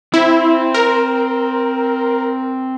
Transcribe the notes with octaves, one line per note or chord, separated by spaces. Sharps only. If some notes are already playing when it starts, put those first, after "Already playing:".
C4 E4 C5
A#4